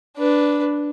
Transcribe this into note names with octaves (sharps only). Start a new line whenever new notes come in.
D4 B4